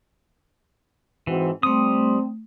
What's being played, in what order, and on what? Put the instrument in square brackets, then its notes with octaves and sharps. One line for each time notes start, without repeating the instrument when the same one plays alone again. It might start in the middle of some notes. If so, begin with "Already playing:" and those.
[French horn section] G#2 C4 F#4 [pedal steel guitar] E3
[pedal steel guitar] G3 D#6 [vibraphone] A3 C6 [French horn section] C4